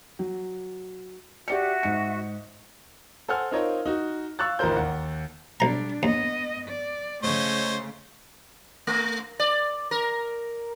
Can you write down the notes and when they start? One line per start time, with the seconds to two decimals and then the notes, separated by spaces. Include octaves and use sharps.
0.19 F#3
1.48 F#4 G4 D5 E5 C#7
1.83 G#2 C#7
3.28 A4 C5 F#5 G#5 F6
3.51 C4 D#4 F4 A#4 C#5 D#5
3.85 D#4 F#4
4.39 F5 C#6 E6 F#6 A6
4.59 A1 D#3 F4 A#4 C5 G6
4.76 D#2 F#5
5.60 B1 G3 D4 A#5
6.03 D#2 B3 D#5
6.67 D5
7.23 C#3 A3 C5 C#5 D#5
8.87 A3
9.39 D5
9.91 A#4